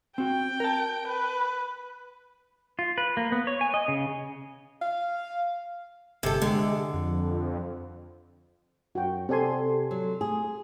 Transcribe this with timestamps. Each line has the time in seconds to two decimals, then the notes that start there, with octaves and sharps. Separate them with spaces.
0.18 C4 F#4 G5
0.60 A#4 A5
1.08 B4
2.79 F4
2.98 B4
3.17 A#3
3.32 B3
3.47 C#5
3.61 G#5
3.74 D#5
3.88 C#3
4.81 F5
6.23 G1 C3 A4
6.42 D3 G#3
6.94 F2
8.95 F#2 F#4 G5
9.29 C3 C4 G4 A4 D5 G#5 C6
9.91 F#3
10.21 A3 G#4